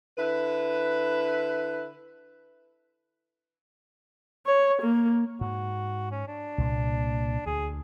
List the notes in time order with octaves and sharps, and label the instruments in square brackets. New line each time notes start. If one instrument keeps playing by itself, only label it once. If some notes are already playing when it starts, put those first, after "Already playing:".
[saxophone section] D3 E4 B4
[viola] C#5
A#3
[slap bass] G#2 [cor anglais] F#4
[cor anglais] C#4
D4
[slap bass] C2 A#2 A#3
[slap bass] D2 [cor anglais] G#4